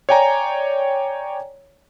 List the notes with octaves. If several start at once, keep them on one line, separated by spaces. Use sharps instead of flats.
C#5 D5 G5 G#5 A#5